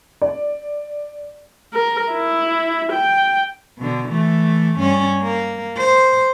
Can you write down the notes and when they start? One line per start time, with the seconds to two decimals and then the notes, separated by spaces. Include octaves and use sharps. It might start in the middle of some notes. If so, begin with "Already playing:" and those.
0.22 D5
1.74 A#4
2.13 E4
2.92 G5
3.78 B2 D3
4.09 E3 A3
4.78 G2 C#4
5.22 A#3
5.77 C5